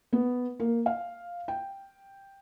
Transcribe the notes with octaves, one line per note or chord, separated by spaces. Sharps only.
B3
A#3
F5
G5